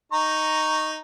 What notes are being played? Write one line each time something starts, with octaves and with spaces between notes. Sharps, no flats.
D#4 A#5 C#6